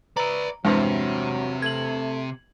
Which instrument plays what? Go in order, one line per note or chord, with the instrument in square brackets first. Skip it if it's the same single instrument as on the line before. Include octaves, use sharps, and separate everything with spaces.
[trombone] B4 [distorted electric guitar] D5 E5 [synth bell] A#5
[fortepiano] E2 G2 C4 [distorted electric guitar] C3 [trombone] F#3 [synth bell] G#3
[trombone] A3 [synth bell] G#6 F#7